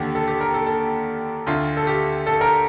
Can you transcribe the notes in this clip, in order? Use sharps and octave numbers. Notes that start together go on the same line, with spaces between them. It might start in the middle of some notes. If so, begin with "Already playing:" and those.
Already playing: D#2 D3 G4
A4
G4
A#4
A4
A4
D2 D3 F4
A4
G4
A4
A#4